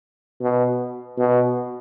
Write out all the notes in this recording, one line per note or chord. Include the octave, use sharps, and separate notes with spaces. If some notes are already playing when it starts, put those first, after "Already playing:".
B2
B2